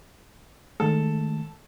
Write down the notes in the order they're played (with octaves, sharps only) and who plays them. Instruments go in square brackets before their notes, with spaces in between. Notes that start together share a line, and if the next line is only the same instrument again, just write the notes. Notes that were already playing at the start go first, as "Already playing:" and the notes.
[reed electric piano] D#3 G#3 A3 [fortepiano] A4